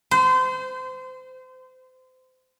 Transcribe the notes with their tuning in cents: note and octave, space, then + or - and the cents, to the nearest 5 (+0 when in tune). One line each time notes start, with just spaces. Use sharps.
C5 -30